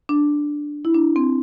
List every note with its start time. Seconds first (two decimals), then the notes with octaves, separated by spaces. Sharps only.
0.09 D4
0.85 E4
0.94 D4
1.16 C4